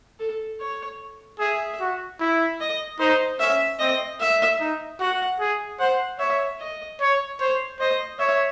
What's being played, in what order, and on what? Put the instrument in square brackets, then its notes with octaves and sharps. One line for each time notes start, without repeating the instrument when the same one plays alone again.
[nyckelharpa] A4
C#5
[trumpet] G#4 [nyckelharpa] E5
[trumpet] F#4
E4
[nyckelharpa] D#5
[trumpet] D#4 [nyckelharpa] C5
[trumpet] C#4 [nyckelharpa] E5
[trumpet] C4 [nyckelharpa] D#5
[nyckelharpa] E5
[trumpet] D#4
[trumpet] F#4 [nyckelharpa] F#5
[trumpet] G#4
[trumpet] C5 [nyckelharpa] F#5
[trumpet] C#5 [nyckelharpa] E5
[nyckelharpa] D#5
[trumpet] C#5
[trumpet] C5 [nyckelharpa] C#5
[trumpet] C5 [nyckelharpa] D#5
[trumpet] C#5 [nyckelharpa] E5